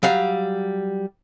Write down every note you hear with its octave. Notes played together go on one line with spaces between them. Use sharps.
F#3 G3 F5